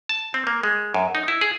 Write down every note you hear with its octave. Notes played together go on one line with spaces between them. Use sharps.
A5
C4
A#3
G#3
F#2
D#4
E4
G#4